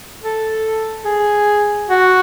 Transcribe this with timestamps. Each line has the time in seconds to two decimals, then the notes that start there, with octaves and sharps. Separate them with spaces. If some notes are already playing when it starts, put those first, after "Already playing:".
0.22 A4
1.05 G#4
1.88 F#4